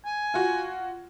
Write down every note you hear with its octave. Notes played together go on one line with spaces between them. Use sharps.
G#5
F4 F#4